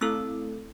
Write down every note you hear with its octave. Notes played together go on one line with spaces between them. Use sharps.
A3 C4 E4 A4 E6